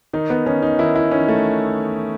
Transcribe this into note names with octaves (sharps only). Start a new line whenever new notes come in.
D#3 D#4
B3
D#3 C#4
D#4
D#3 E4
E4
D#3 C#4
A3